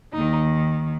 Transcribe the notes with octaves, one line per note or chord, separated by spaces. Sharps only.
D#2 D#3 D#4